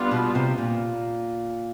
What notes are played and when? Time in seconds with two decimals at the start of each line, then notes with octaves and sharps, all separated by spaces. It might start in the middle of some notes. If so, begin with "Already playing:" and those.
Already playing: G3 B3 D4 F4
0.11 B2
0.35 C3
0.58 A#2